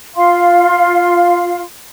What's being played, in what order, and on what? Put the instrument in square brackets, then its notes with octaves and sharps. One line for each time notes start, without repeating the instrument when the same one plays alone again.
[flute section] F4 F5 C6